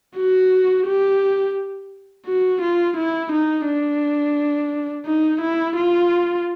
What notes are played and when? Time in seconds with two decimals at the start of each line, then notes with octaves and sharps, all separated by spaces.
0.17 F#4
0.87 G4
2.26 F#4
2.62 F4
2.97 E4
3.32 D#4
3.66 D4
5.06 D#4
5.42 E4
5.76 F4